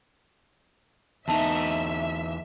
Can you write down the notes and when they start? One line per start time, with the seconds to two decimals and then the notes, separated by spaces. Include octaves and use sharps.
1.28 E2 D#4 E4 E5 A5